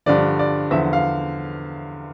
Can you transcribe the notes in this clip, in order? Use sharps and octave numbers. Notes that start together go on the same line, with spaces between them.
G2 D3 F3 D5
D5
E2 D3 F3 E5
F5